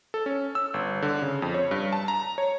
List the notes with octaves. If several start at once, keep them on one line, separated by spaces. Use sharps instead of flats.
A4
C#4
E6
G1
D3
C#3
F2
C#5
G2
A5
A#5
C#5